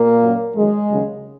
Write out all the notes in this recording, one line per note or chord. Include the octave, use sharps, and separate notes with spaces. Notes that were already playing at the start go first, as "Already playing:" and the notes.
Already playing: A#2 A#3
F#2 F#3
F#2 D#3 F#3 G#3
D#2 C#3 F#3